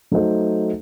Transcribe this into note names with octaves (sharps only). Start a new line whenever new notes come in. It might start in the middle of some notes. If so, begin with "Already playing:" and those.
F#3 A3 D#4 A4 C5